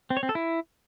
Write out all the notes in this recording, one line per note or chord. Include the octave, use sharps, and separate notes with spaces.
C4
C#5
C4
A4
E4